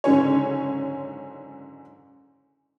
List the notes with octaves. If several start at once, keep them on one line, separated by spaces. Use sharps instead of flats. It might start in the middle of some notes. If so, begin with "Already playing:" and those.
F#1 G#2 D3 C#4 C#5